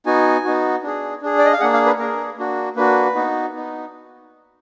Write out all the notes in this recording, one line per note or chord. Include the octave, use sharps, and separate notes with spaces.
B3 D#4 F#4 G#5
B3 D#4 F#4
D4 G#4
D4 G#4
D5
D#5
F5
A#3 D4 G#4 F#5
F5
B4
A#3 D4 G#4 A#4
A#3 D4 F#4
A#3 D4 F#4 B4
B3 D#4 F#4
B3 D#4